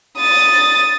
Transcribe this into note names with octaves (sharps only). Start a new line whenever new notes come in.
D#6 A6